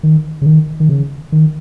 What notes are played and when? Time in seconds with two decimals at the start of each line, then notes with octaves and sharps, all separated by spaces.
0.03 D#3
0.42 C#3
0.46 D#3
0.80 D#3
0.89 C#3
1.32 D#3